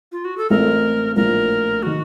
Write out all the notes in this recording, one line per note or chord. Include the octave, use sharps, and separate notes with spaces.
F4
F#4
A4
A1 A2 A3 C4 F4 A#4
A#1 A2 F3 A#4
D#3 F#4